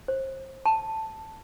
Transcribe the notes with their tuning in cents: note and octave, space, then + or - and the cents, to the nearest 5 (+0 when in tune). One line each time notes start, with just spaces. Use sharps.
C5 +30
A5 +5